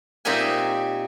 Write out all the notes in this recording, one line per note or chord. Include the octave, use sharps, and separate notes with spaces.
A#2 C4 D#4 G4 E5 G#5